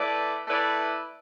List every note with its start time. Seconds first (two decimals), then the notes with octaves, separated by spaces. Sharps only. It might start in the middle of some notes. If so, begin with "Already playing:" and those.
Already playing: A3 E4 B4 D5
0.48 A3 E4 B4 D5